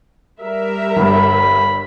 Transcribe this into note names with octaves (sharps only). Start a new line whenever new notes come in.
G3 A#4 E5
G1 G2 B5